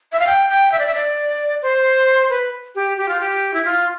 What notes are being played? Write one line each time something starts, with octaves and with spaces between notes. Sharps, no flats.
E5
F5
G5
G5
E5
D5
E5
D5
C5
B4
G4
G4
F4
G4
E4
F4